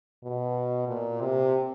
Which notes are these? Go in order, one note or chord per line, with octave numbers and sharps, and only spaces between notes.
B2
A#2
C3